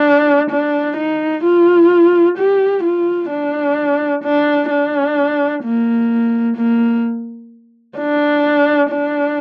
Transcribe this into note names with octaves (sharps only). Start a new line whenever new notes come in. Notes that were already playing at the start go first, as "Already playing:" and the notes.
Already playing: D4
D4
D#4
F4
G4
F4
D4
D4
D4
A#3
A#3
D4
D4